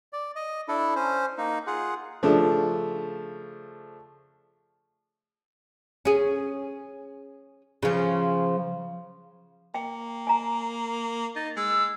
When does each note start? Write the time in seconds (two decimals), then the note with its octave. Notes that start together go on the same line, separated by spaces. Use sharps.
0.13 D5
0.36 D#5
0.68 D4 E4 A4
0.96 C#4 C5
1.38 A#3 D#4
1.67 F4 G#4 F#5
2.23 C#3 F3 A3 D4
6.05 C#4 G#4
7.83 C#3 F3
9.74 A#3 G5
10.27 G#5 A#5
11.36 D#4 A6
11.57 G#3 E6